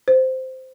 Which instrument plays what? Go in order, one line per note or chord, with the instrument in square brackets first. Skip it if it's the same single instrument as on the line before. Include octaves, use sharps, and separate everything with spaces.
[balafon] C5